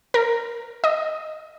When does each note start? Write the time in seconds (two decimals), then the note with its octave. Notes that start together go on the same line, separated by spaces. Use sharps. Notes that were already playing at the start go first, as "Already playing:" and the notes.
0.14 A#4
0.84 D#5